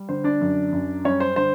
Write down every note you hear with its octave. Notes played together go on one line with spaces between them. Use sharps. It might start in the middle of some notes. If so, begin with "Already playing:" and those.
Already playing: G3
D3 C5
D4 D5
F#2
F#2
G3 C#4 C#5
C5
D3 C5